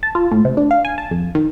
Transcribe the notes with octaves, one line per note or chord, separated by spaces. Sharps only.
A5
F4
A2
C3
D4
F5
G#5
A5
F2
D#3